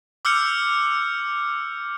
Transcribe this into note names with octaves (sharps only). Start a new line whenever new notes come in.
D6 E6 F6 G6 C#7